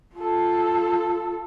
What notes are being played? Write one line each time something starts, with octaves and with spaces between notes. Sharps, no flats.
F4 A4